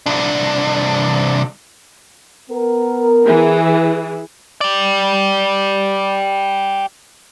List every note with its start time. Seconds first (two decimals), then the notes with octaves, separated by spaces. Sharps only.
0.06 C2 D4
2.50 B3 A#4
3.25 E3 G#4
4.61 G4 D5